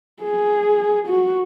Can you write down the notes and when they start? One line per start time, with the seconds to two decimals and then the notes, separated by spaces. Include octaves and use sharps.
0.22 G#4
1.07 F#4